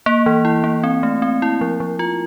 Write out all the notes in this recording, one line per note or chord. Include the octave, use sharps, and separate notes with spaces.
A#3
E3
E4
A#3
C4
A3
C4
E4
F3
F3
F4